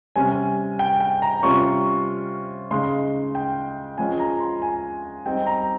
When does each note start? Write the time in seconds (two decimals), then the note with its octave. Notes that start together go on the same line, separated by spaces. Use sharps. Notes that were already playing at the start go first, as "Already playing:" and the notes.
0.16 C3 G3 C#4 G#5
0.79 G5
1.00 G5
1.22 A#5
1.43 C3 G3 C#4 F4 C#6
2.71 C#3 G#3 D#4 C6
3.35 G5
3.98 F3 G#3 C#4 F4 G#5
4.20 A#5
4.40 C6
4.62 G#5
5.25 G3 C4 D#4 G5
5.47 A#5